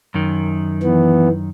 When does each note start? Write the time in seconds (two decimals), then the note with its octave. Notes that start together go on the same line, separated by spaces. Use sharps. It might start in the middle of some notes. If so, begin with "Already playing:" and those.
0.14 F#2 D#3
0.83 E3 B3